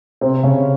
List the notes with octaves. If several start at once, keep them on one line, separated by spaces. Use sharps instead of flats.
C3 C4
C#3 C#4